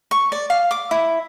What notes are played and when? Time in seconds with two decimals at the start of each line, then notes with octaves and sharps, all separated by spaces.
0.11 C#6
0.32 D5
0.50 F5
0.71 D6
0.91 E4